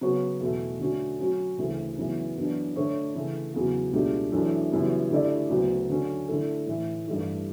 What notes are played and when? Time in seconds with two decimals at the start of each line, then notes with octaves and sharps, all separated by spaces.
0.01 C#3 F#3 B3 F#4 C#5
0.40 E2 B2 A3
0.80 D3 A3 C#4 F#4
1.19 F#3 C#4 F#4
1.57 D2 C#3 E3 A3
1.97 F#2 C#3 E3 B3
2.36 F#2 E3 B3 D4
2.76 D3 A3 D4 A4 C#5
3.15 C#3 E3 A3
3.54 E2 C#3 F#3
3.93 C#2 B2 A3 D4 G4
4.32 F#2 E3 A3 D4
4.72 F#2 C#3 E3 G3 B3
5.10 D3 A3 E4 G4 D5
5.50 D2 C#3 F#3 B3
5.90 D3 F#3 C#4
6.28 D3 A3 E4 A4
6.67 A2 E3 A3
7.07 G2 E3 A3 E4